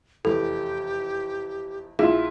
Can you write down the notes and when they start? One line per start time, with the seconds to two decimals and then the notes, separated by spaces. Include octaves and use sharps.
0.25 F1 E2 G4 A4
1.99 A#1 E4 F4 G#4 F5 E7